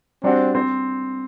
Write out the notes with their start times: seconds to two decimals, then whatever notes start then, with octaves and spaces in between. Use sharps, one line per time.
0.23 G3 C4 D4 F#4
0.55 C4